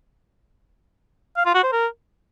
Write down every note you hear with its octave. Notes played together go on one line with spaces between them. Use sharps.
F5
F4
F#4
C5
A#4